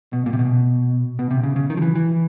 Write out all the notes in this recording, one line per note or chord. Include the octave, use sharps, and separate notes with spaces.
B2
A#2
C3
B2
B2
C3
C#3
C#3
D#3
F3
E3
E3